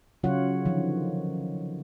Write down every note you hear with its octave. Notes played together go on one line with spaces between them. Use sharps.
C#3 F#3 C#4 F4 C#5 F#5
D3 D#3 F3 C#4